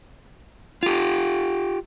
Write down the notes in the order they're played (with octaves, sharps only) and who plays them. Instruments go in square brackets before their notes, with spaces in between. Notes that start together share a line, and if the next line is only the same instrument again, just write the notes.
[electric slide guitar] F4 G4